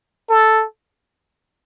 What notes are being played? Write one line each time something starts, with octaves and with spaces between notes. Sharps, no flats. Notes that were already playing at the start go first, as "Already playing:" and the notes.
A4